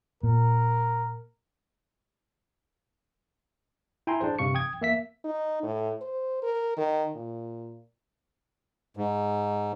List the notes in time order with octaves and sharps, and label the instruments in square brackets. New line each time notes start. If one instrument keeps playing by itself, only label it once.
[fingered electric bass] A#2 [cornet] A#4
[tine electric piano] E4 G5 G#5 A#5 C6
D4 G#4 C5
G2 C3 F5 C#6 C#7
G5 D#6 G#6
A#3 E5 B6
[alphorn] D#4
A2
C5
A#4
D#3
A#2
[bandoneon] G#2